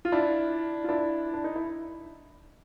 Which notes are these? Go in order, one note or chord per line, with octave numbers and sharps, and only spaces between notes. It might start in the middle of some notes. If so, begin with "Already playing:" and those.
F4
D4 E4
F4
D4 E4
D4
D#4
E4